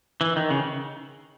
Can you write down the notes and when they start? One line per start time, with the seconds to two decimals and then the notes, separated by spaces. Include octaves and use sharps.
0.21 E3
0.36 D#3
0.50 C#3